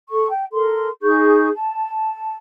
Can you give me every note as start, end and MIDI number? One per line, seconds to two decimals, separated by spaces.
0.10 0.30 69
0.10 0.30 85
0.30 0.44 79
0.52 0.88 69
0.52 0.88 70
0.52 0.88 84
1.02 1.49 63
1.02 1.49 68
1.02 1.49 85
1.02 1.49 91
1.54 2.35 81